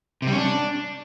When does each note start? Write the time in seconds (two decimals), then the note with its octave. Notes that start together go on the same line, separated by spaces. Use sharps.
0.22 C3
0.27 G3
0.33 C#4
0.38 D4